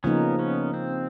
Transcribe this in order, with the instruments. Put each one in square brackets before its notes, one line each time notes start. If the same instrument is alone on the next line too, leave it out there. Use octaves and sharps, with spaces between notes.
[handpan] C#3 F3 A#3 D#4 [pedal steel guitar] B3 C#4
[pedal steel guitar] B3 C#4
C4